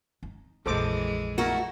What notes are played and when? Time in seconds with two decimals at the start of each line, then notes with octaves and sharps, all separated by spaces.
0.23 D#4
0.66 A#1 F2 E3 G#3 A4 C5 D6
1.38 A3 E4 F#4 A#4